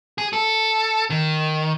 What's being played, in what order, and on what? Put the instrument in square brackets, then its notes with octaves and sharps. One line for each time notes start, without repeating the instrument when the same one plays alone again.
[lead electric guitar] G#4
A4
D#3